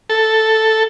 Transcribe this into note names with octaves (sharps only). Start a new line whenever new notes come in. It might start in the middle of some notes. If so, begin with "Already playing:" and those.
A4